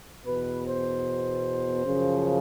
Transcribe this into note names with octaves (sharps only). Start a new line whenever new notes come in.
E2 B2 B4
C5
F#2 C#3 F3